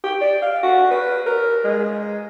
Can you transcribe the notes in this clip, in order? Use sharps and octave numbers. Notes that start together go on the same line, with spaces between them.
G4
D5
F5
F#4
B4
A#4
G#3